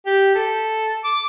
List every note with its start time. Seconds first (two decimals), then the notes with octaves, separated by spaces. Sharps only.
0.06 G4
0.35 A4
1.04 D6